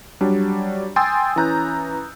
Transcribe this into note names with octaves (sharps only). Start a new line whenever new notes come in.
F#3 G3 D4
G5 G#5 C6 D#6 E6 A6
E3 C#4 A#5 F#6 G6